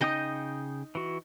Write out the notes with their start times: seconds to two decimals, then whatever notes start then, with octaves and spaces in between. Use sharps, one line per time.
0.01 C#3 D#4 D#5 G5 D#6
0.95 E3 F#4